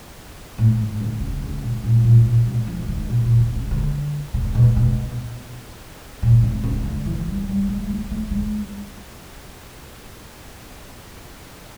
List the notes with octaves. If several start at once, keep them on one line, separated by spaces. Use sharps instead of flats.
A2
G#2
D3
C#3
C#3
B2
A#2
A#2
A#2
B2
F3
D#3
B2
A#2
C3
C#3
D3
C3
B2
B2
A#2
C3
C#3
D3
E3
G3
G3
G#3
A3
A3
G#3